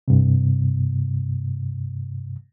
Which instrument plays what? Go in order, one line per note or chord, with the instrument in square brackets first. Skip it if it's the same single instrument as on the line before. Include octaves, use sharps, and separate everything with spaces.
[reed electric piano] G2 C3